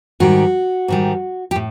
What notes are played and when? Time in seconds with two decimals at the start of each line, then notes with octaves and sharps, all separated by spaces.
0.20 G#2 D#3 G3 F#4
0.88 G#2 D#3 G3
1.51 G4
1.56 A2